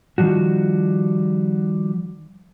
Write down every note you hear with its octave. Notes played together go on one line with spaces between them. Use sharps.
D#3 F3 G3 F#4